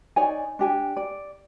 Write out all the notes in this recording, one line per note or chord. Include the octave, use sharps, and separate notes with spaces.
D#4 C#5 D5 G#5
D4 G4 G#5
D5